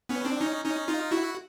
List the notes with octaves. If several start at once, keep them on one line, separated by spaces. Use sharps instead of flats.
B3 C#4
C4 D4
C#4 D#4
C#4 D#4
D#4 F4
E4 F#4